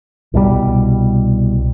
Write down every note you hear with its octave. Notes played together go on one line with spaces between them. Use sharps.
C2 B2 E3 G3